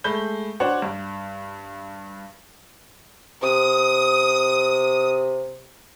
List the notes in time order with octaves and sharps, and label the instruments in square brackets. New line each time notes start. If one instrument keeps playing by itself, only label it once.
[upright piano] G#3 A3 B5 G6 G7
D4 F#4 C5 C#5 F#5
G2
[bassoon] C3 [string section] D#6